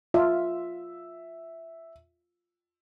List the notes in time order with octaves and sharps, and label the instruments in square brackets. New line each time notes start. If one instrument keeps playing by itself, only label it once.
[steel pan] F4 [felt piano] E5